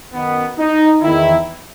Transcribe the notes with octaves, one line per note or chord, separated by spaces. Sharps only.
F#2 D#3 B3
D#4
E2 D#3 E4